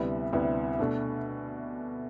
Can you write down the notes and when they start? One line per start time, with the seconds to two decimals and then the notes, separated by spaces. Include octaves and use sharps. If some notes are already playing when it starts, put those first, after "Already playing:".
Already playing: D2 C3 G3 B3 E4
0.33 D2 C3 G3 B3 E4
0.79 B2 A3 D4